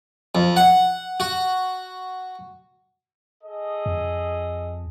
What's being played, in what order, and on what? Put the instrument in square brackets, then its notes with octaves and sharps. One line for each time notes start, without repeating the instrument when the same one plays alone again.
[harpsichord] F2
F#5
F#4
[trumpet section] G#4 A4 D#5
[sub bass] F2